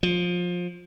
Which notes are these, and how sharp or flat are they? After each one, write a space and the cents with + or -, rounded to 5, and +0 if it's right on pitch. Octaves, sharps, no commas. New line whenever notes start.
F3 +20